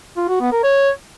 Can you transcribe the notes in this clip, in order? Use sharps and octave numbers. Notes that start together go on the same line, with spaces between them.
F4
F#4
B3
A#4
C#5